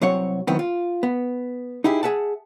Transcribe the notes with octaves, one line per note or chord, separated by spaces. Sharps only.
C2 C3 F#3 C4 C#5 F#5
D#3 E3 F#3 B3 C4
F4
B3
D#4 E4 G4 G#4
G#4 E5 F#5 A5